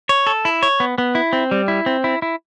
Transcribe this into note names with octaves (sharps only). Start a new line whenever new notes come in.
C#5
A4
E4
C#5
B3
B3
E4
C4
G3
E4
C4
E4
E4